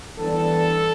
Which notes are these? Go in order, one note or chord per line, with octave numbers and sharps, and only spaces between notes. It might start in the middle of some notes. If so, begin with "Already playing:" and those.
E3 G3 B3 D4 A4